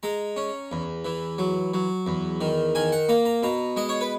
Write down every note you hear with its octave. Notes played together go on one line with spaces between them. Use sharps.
G#3 A#5
C#4
E2
E3
F#3
F#3
E2
D#3
D#3 G#5
F#5
A#3 A#5
A#5
B2 A#5
G#3 D#5
C#5
B4